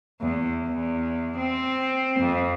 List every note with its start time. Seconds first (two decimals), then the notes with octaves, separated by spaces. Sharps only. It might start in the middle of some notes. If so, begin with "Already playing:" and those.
0.21 E2
0.67 E2
1.37 C4
2.20 F2